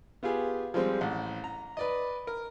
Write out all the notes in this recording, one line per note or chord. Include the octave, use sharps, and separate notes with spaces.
B3 F4 G4 G#4
F3 G3 G#3 C4
A1 F#5
A#5
B4 D5 D#5
A#4